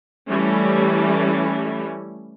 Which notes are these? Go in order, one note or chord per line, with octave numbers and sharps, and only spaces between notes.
E3 G3 A3 C#4 E4